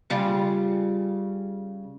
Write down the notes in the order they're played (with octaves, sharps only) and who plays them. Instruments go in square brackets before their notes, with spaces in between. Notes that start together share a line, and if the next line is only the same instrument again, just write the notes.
[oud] C#3 G3 F4